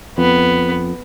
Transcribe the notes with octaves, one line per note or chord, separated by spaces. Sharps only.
F2 B3